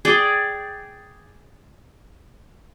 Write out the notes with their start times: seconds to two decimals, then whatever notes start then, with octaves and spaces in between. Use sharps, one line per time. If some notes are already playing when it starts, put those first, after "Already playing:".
0.05 G#4 D5 G5